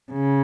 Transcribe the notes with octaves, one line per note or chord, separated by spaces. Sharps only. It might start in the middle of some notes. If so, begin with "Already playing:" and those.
C#3